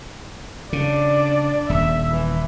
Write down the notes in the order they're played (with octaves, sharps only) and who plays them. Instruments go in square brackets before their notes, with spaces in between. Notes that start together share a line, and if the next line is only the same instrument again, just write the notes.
[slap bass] C#3 [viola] D4 D5
[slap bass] D#1 [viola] E5
[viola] E3